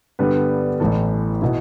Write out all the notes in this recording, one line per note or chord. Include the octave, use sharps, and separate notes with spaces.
G2 D3 G3 B3 B4
A1 A2 E3 A4
B2 B3 E4